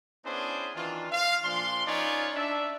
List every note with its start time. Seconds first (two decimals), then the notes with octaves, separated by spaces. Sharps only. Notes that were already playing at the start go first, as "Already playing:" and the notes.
0.25 B3 C#4 D4 E4 G#4 C5
0.76 D#3 E3 D4 F4
1.12 F5
1.44 A#2 F3 D4 C6
1.86 C#4 D#4 F4 B4 C#5 D5
2.35 D4 E5